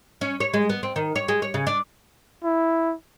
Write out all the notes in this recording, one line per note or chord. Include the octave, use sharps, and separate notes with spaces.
C#4
C#5
G#3
B3
C4
D#3
C#5
G#3
C#5
C#3
D4
E4